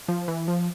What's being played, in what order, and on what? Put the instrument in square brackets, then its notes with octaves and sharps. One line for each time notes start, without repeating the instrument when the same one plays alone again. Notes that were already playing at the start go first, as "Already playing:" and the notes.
[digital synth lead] F3
E3
F3